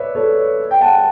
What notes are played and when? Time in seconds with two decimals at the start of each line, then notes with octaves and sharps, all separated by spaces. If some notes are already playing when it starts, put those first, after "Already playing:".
Already playing: B4 C#5 D5 E5
0.15 A4 C#5
0.71 G5
0.81 F#5 A5